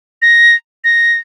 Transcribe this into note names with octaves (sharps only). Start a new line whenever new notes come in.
A#6
A#6